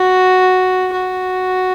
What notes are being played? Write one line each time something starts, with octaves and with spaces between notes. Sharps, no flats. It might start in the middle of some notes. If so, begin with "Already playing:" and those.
Already playing: F#4
F#4